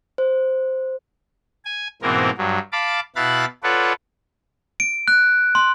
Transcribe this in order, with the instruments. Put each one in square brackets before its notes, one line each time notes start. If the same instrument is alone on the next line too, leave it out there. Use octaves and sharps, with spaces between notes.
[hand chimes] C5
[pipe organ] G#5
G#2 B2 E3 A#3 C4 A#4
G2 F#3
F5 A5 B5 D6
B2 E4 F5 B5 F#6 A6
F4 A4 B4 C#5 D5 F#5
[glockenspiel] D7
F#6
C6